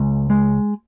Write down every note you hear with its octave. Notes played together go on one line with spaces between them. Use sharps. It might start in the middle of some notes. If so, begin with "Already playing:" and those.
Already playing: C#2 G#3
G#3